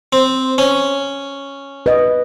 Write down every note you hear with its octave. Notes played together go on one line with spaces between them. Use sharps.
C4
C#4
B4 D#5